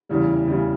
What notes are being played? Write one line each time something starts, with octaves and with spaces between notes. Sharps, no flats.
E2 C#3 E3 G3
E2 C#3 E3 G3